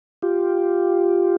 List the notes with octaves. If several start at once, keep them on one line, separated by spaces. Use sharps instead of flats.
F4 G4